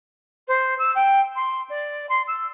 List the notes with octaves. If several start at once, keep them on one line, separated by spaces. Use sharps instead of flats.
C5
E6
G5
C6
D5
C6
E6